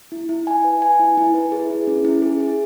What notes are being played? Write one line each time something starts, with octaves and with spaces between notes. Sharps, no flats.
E4
E4
G#5
B4
G#5
E4
E4
B4
G#4
E4
C#4
E4
G#4
G#4